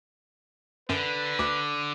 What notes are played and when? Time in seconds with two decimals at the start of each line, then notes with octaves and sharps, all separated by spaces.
0.90 F#2 D3 B4
1.39 D2 D6